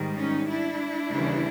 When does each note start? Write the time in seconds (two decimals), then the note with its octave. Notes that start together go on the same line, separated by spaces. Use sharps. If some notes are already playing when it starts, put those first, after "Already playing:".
Already playing: G#2 D#3 G3
0.17 C#4 D#4
0.48 D4 E4
1.11 D#2 C#3 E3 G3